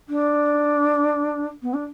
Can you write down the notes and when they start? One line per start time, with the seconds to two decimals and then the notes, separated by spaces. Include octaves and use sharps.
0.09 D4
1.62 B3
1.74 D4